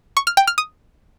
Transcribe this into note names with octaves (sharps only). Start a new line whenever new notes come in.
C#6
F6
G5
F6
D#6